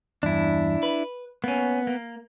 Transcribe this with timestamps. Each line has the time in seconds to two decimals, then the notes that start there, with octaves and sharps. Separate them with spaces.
0.23 E2 G2 D4 E4
0.83 B4
1.44 A#3 B3 C#4
1.87 A#3